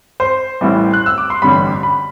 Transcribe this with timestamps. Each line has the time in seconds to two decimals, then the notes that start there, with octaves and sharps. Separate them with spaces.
0.20 C5
0.61 A1 A2 E3 G3
0.94 F#6
1.06 E6
1.18 D6
1.30 C6
1.42 A1 G2 D3 G3 B5
1.83 B5